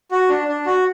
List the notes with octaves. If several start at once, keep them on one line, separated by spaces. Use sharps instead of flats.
F#4
D4
D4
F#4